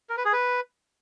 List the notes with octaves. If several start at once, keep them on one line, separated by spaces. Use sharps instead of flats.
A#4
B4
G#4
B4